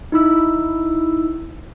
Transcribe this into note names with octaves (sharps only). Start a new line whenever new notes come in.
D#4 E4 E6